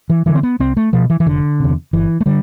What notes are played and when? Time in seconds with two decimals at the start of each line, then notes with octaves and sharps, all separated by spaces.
0.10 E3
0.26 G2 D3 E3
0.35 C4
0.43 B3
0.60 C2 C4
0.77 A3
0.93 B2 F3
1.10 E3
1.20 E3
1.26 F1 D3
1.60 E2 C3
1.93 G1 E3
2.21 A3
2.26 D3 G3